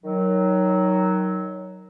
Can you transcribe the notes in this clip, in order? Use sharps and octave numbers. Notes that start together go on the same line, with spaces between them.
D#3 F#3